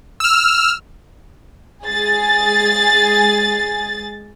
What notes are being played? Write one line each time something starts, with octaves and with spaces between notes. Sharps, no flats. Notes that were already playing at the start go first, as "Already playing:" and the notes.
E6 F6
G#3 G#4 A6